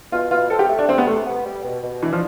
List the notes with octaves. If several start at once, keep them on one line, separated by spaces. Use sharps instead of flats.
B2 F4
B2 F4
C4 A4
G4
A3
D4
C3 C4
B3
C3 A3
B3
G3
B2
B2
E3 D4
F3